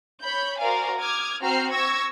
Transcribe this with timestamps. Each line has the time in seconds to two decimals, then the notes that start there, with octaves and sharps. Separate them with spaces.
0.23 C#5 B5 G6
0.60 F#4 A#4 C5 D5 F5 G#5
0.98 D6 D#6 F6 G#6
1.41 C4 F#4 A#5 F6 G6 C7
1.72 C#6 E6 G#6 A#6